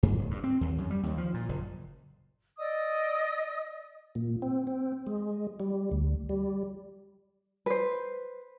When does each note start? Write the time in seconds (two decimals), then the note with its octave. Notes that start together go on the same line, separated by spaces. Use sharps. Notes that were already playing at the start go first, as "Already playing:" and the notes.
0.03 G2
0.18 D1
0.31 G2
0.44 C4
0.61 D#2
0.78 F#2
0.91 G3
1.03 D#2
1.18 F3
1.34 A#2
1.49 F#1
2.58 D5 D#5 D#6 E6
4.15 A#2
4.42 C4
4.67 C4
5.07 G#3
5.60 G3
5.91 D2
6.29 G3
7.66 B4 C5